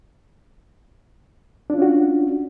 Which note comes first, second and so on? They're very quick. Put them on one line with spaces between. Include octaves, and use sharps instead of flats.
D4 F4 C#4 F#4